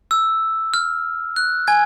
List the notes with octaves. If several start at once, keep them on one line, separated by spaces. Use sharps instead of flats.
E6
F6
F#6
G#5 G#6